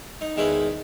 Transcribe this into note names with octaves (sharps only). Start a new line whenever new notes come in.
D#4
E2 D#3 G#3 E4 B4